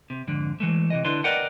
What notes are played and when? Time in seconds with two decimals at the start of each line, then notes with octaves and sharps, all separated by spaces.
0.10 C3
0.27 F2 G#2 D3
0.60 E3 G#3 A3
0.90 C3 E3 D#5
1.05 D3 D4 E4 B4 D5 C6
1.24 A#4 B4 D5 D#5 F#5 G5